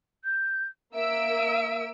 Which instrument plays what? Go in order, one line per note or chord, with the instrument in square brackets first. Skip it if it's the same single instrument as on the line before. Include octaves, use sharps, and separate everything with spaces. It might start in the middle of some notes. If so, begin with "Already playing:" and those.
[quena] G6
[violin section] A#3 E6 D7 [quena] E5